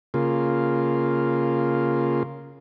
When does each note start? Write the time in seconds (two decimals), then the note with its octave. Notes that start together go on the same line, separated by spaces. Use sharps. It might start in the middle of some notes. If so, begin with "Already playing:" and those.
0.14 C#3 A#3 F4